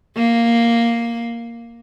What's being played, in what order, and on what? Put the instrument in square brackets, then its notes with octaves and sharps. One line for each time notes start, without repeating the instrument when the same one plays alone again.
[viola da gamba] A#3